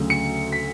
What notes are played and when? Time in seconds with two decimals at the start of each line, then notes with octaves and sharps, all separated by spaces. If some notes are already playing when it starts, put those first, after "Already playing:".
Already playing: D2 C#3 F#3 A3
0.10 C#7
0.52 B6